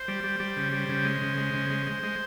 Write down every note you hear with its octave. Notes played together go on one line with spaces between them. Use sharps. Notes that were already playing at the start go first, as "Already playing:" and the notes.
Already playing: C5
G3
G3
G3
C#3
G3
C#3
G#3
C#3
G#3
C#3
G#3
G#3
G#3